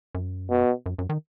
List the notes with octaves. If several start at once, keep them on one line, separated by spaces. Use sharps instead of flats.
F#2
B2
F#2
F#2
D#3